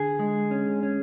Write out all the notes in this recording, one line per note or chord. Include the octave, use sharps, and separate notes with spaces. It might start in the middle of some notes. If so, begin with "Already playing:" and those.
Already playing: D3 G#4
G#3
C#4
C#4